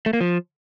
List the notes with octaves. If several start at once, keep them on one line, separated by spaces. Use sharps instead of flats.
A3
A#3
F3